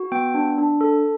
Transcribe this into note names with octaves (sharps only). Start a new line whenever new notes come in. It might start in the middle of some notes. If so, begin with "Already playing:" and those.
Already playing: F#4
B3 G5
D4
D4
A4